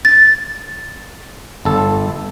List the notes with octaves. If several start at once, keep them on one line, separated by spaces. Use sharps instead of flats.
A6
G1 A4